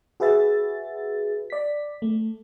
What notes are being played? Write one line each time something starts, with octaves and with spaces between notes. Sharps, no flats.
F#4 G#4 B4 E5 A6
D5 B6
A3